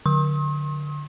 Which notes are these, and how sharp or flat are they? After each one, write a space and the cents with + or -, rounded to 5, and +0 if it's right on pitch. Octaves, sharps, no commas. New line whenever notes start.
D3 +0 C6 +45 D#6 +45